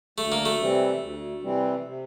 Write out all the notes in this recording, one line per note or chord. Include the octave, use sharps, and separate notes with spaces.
D2 A3
A#3
A3
C3 E3 G3 C4
D2
C3 E3 G3 C4
C3